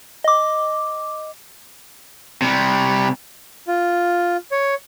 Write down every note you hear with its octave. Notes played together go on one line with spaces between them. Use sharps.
D#5 D6
C3 G3
F4
C#5